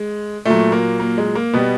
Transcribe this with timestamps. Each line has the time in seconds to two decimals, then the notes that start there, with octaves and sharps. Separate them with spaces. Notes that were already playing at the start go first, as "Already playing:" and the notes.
Already playing: G#3
0.45 A#2 F#3 A3
0.72 A#3
1.00 A#3
1.18 G#3
1.35 A#3
1.53 B2 G3 B3